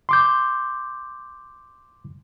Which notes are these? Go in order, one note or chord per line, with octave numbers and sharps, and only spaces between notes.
C6 D6 G6